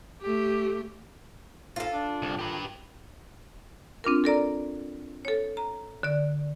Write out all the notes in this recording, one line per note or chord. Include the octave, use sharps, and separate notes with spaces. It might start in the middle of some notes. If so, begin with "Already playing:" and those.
A3 G4
G#2 F4 A4
D4
C2
D#3 G4 B4
C4 D4 F4 A#4
A4 A#4 D5 A#5
A4 C#5
A#5
D3 D5